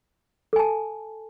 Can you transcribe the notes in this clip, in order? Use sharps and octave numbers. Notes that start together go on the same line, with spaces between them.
A4 G#5 A5